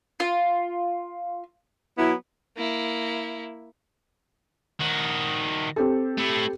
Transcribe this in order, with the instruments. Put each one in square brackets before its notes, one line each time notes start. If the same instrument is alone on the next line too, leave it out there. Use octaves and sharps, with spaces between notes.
[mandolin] F4
[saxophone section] F#3 B3 E4
[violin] A#3 E4
[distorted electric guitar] D#3 F#4
[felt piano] C4 G4 A4
[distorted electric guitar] A3 E4